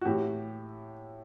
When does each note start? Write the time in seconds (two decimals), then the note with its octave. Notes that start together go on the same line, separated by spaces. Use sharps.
0.01 F#4
0.05 A2 E3 G4